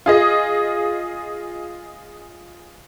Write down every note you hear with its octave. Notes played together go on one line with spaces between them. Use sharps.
F4 G#4 D#5